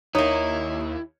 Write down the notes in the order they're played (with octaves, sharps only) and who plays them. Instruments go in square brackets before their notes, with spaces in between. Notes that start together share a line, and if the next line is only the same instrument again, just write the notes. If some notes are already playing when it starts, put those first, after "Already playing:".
[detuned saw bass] D#2 [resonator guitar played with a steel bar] A#3 D#4 [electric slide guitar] E4 [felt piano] C#5